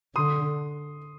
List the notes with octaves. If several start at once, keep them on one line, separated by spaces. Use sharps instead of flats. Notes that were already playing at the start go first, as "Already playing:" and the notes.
D3 C6 D#6